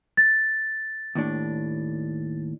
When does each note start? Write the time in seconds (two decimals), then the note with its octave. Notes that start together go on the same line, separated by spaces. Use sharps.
0.17 A6
1.15 D#2 A2 D4